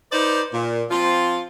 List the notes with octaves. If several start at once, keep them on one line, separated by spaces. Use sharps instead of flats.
D#4 B4 C5 D5
A#2
F3 C4 F4